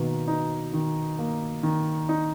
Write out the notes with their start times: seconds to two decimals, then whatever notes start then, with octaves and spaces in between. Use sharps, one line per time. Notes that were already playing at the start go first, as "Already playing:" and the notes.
Already playing: B2 D#3 A#3
0.28 D#4
0.73 D#3
1.19 A#3
1.63 D#3
2.08 A#2 D#4